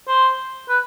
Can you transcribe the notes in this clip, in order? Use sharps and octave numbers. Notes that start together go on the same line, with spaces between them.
C5
B4